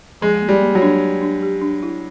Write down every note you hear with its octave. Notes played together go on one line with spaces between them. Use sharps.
F3 G#3
A#3
G3
A#3
F#3
D4
D4
D4
G4
D4
E4